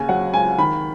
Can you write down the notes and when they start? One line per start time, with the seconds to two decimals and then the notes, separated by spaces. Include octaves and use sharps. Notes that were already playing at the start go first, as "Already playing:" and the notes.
Already playing: D#2 C#3 G#5
0.09 F#3 F#5
0.33 C#2 G#5
0.58 D#3 B5